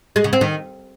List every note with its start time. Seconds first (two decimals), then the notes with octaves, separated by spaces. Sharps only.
0.16 G#3
0.24 C#3
0.33 C4
0.41 D#3